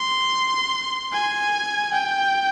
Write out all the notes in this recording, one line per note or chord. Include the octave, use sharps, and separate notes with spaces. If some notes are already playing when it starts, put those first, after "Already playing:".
Already playing: C6
G#5
G5